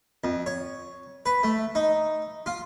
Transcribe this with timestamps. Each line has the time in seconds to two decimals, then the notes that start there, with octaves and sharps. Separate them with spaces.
0.24 F2
0.46 C#5
1.26 B4
1.43 A3
1.75 D#4
2.46 F4